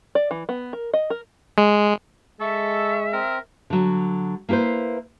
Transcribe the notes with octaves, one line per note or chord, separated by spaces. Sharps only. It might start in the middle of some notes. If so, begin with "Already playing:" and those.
D5
E3
B3
A#4
D#5
A#4
G#3
G#3 A4 E5 C#6
C4 A#4
D3 F#3
A#3 E4 G#4 B4 C5